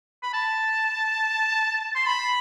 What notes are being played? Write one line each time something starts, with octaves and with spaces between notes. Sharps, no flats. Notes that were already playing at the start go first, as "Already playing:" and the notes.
B5
A5
C6
B5